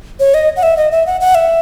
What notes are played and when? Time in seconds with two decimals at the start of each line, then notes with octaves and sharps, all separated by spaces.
0.20 C#5
0.34 D#5
0.56 F#5
0.63 E5
0.77 D#5
0.91 E5
1.06 F#5
1.21 F#5
1.35 E5